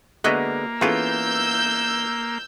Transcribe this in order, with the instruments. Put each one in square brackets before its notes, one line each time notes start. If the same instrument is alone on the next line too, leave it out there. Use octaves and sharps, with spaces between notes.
[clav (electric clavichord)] D3 G#3 B3 [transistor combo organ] A#3 [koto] F#4 D#5 E5
[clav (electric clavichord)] E3 B3 F4 [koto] C#4 G#4 A4 [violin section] E6 G6